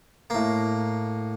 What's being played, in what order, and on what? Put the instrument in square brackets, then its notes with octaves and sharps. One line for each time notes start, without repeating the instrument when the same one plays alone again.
[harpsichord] A2 A#3